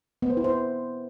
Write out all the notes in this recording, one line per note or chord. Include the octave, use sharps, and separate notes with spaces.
B3
C5
E4
C5